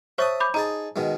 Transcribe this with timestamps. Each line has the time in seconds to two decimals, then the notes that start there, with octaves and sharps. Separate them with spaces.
0.18 C5 C#5 E5 A5 C#6 D#6
0.40 B5 D6 G6
0.54 D#4 G#4 A5 A#5
0.96 B2 D#3 G#3